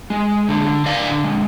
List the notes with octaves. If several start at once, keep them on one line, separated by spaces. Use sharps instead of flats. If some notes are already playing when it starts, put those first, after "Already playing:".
G#3
D3
D3 D5 F5
G#3